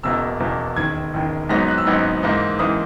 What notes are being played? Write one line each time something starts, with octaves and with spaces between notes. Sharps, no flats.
E1 E2 B2 A#3 E6
E1 E2 B2 A#3
E1 D#2 D#3 G#6
E1 D#2 D#3
G#1 G#2 F#3 B3 D#4 A#6
F#6
E6
G#1 G#2 F#3 B3 D#4
G#2 E3 A#3 D#4
G#2 E3 A#3 D#4 D#6